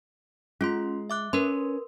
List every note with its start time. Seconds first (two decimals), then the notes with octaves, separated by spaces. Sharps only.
0.61 G#3 C#4 F4 C6
1.10 E5 D6 F#6
1.33 C#4 A#4 B4 C6